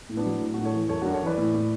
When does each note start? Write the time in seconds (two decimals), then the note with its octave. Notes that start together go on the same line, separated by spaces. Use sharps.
0.09 A2
0.17 B3 D4
0.26 F#3
0.41 A2
0.54 A2 D4 F#4
0.65 A4 C#5
0.74 E3
0.89 F#2 A4 C#5
1.02 F#2 D4 F#4
1.14 A4 C#5
1.23 E3 B4 D5
1.38 A2
1.54 A2